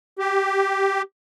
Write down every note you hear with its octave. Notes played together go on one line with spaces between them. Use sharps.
G4